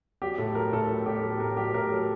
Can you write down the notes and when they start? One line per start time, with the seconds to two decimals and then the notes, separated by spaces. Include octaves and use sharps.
0.22 F#3 G4
0.38 A2 A4
0.55 F#3 A#4
0.72 A2 A4
0.89 F#3 A4
1.06 A2 G4
1.23 F#3 A4
1.40 A2 A#4
1.57 F#3 G4
1.74 A2 A#4
1.92 F#3 A4